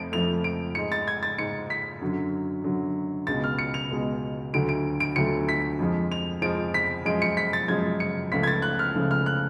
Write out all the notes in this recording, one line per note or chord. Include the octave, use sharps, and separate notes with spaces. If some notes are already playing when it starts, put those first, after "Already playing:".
Already playing: F2 F3 A3 D7
F2 F3 A3 F7
D7
G#2 G#3 C#7
A6
G#6
A6
G#2 G#3 C#7
B6
F#2 D3 F#3
F#2 D3 F#3
C#2 B2 G#3 A6
F6
C#7
F7
C#2 B2 G#3
D2 D3 F#3 A3 D7
D7
D7
D2 D3 F#3 A3 C#7
B6
F2 F3 G#3
F7
F2 F3 G#3 D7
B6
F#2 F3 G#3 D7
C#7
B6
A6
F#2 F3 G#3 G#6
C#7
C#2 C#3 F3 A3 B6
G#6
A6
F#6
F6
C#2 C#3 F3 A3
F6
F#6